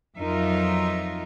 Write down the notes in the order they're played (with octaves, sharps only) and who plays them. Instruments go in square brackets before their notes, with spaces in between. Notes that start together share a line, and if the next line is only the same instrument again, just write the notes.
[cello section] F2 F#3 D#4 F4 A#4 E5